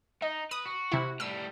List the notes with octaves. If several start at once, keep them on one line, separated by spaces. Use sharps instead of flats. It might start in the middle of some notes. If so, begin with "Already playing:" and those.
D#4 D#5
B4 D#6
F#4
C3 E4
A2 G3 E6